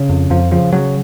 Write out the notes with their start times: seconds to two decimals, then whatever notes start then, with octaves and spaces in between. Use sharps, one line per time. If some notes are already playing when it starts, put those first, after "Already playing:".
Already playing: C#3
0.09 F2
0.30 F2 F3
0.51 C#3 F3
0.73 C#3 F#3